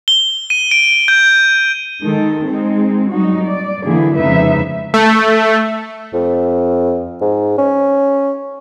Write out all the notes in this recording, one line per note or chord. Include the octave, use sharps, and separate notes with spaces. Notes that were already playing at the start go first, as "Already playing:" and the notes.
G7
D#7
D7
G6
D#3 G#3 D#4 A4
G#3 C4 D#4
F#3 G3 D#4 F#4
D5
D3 E3 F#3 A#3 E4 G#4
F2 C#3 G#3 D#4 B4 E5
A3
F2
G#2
C#4